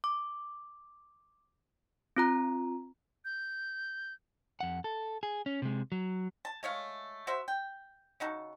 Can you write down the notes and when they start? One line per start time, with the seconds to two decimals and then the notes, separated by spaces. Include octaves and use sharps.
0.04 D6
2.16 C4 F4 A#5
3.25 G6
4.60 F2 F#5
4.84 A4
5.23 G#4
5.46 C#4
5.62 C3 G#3
5.92 F#3
6.45 A5
6.63 G#3 A3 C#5 F5
7.27 F#4 C5 E5
7.48 G5
8.20 C#3 D#4 F#4 A4